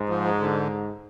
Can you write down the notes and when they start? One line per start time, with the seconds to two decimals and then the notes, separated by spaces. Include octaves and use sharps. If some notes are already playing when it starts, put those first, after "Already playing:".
Already playing: G#2
0.09 F3
0.25 G#3
0.40 D3